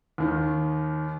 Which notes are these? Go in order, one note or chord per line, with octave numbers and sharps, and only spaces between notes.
D#2 D#3